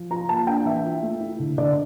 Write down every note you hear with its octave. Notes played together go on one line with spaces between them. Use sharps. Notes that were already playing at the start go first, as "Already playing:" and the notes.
Already playing: F3
F4 A#5
A#3 A5
D4 G5
E3 E5
F4
A3
E4
D3
D3 D5